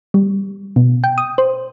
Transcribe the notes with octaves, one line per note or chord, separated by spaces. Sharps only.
G3
B2
G5
D#6
C5